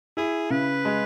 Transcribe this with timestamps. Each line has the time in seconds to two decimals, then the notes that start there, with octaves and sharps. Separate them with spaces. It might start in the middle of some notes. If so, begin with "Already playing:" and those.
0.17 E4 G#4
0.50 C#3 B4
0.85 G#3